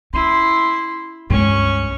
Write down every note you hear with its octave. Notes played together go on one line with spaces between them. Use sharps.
C#4 E4 C6
C#2 G2 C#4 C#6